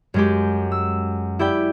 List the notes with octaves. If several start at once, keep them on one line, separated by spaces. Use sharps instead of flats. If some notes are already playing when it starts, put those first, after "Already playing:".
F#2 G#3 G4
E6
E4 G4 D5 G5